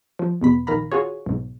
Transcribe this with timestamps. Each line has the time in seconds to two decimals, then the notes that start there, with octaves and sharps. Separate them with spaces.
0.19 F3
0.41 E2 B2 B5
0.67 A#1 D#3 F5 A#5 B5
0.92 F4 F#4 G#4 C#5
1.26 B1 G#2